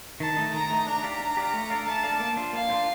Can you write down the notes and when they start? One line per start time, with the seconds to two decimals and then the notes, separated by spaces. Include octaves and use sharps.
0.20 D#3 A5
0.37 A3 D#4
0.54 D#3 A#5
0.70 A3 D#4
0.87 D4 A#5
1.03 G4 D5 F5
1.20 D4
1.37 G4 D5 F5
1.54 A3
1.70 D4 A4 D5 F5
1.87 A3 A5
2.03 D4 A4 D5 F5
2.20 A#3
2.36 D4 F4 C5
2.53 A#3 F5
2.70 D4 F4 C5